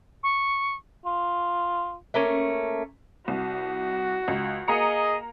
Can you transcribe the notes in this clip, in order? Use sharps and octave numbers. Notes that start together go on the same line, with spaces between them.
C#6
F4
A3 A#3 C#4
C2 F#4
C#2
A#3 G#4 D#5 A#5 C#7